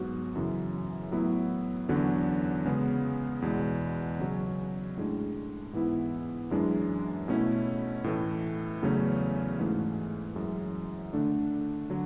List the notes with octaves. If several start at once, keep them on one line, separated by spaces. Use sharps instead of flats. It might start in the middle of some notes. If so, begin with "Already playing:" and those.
Already playing: G#2 F#3 B3 F#4
F#2 C#3 E3
A2 F#3 B3 E4
E2 D3 F#3 C#4
C#3 G#3 B3
E2 B2 G#3
C#3 F#3 C#4
A2 G#3 D4
G#2 E3 B3 E4
F#2 E3 G#3 D4
B2 A3 C#4 E4
A2 E3 A3
E2 C#3 F#3 A3 C#4
G#2 E3 A3
F#2 E3 G#3
D3 A3 D4
D3 F#3